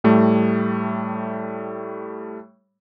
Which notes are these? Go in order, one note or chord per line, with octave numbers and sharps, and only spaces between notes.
A2 G3 A3